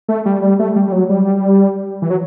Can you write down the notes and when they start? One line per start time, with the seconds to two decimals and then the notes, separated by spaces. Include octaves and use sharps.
0.09 A3
0.26 G3
0.42 G3
0.59 A3
0.76 G3
0.88 G3
0.92 F#3
1.09 G3
2.02 E3
2.10 F#3